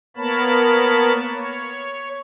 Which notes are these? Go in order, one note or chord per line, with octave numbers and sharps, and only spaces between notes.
A#3 B3 A#4 C#5 A5 B5
C#5